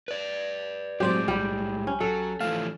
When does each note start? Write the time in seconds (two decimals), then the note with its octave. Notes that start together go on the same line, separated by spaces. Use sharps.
0.08 B4 D5
1.00 A2 F#3 G#3 C4 G4 C5 D5
1.28 B1 G3 G4
1.87 C#4
2.01 F#3 A4
2.41 E3 F3 A3 F5